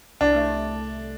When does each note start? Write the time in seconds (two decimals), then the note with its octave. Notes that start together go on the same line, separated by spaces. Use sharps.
0.21 C2 D4
0.35 A3